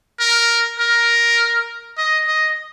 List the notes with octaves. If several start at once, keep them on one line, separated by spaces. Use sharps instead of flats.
A#4
A#4
D#5
D#5